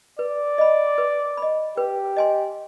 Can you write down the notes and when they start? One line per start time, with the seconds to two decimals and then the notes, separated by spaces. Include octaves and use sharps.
0.19 B4 D5
0.58 D#5 B5
0.98 B4
1.37 D#5 B5
1.77 G4 B4
2.17 D#5 G#5 C6